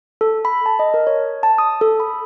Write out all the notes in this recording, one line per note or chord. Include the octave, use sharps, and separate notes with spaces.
A4
B5
A5
D#5
A#4
C#5
A5
D#6
A4
B5